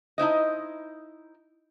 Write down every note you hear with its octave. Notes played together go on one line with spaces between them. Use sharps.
D#4 E4 C5 D#5